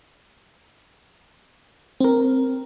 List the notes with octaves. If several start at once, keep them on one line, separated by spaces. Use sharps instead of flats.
C4 A#4